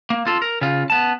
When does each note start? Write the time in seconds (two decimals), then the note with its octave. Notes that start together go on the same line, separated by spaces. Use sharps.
0.10 A#3
0.27 F4 A4
0.42 A#4
0.61 C#3 F4
0.90 B3 A5